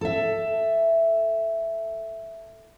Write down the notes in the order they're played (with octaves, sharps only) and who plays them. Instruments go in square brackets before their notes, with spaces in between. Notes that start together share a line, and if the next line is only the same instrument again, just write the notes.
[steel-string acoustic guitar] A4 E5